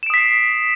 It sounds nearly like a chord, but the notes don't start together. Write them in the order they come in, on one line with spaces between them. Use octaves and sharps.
E7 D7 D#6 B6 C7